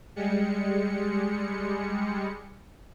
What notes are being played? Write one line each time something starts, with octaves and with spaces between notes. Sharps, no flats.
G3 G#3 C#7